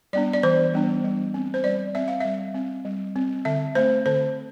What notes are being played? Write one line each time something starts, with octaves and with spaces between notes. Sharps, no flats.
G3 B3 D4 D5
D5
E3 C5
G3 B3 D4
G3
C4
C5
G3 D5
C4 E5
F5
G3 E5
C4
G3
C4
D3 E5
A3 C4 C5
D3 C5